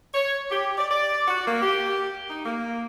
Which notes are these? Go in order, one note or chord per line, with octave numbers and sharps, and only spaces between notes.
C#5
G4
D5
D5
F#4
A#3
G4
D#4
A#3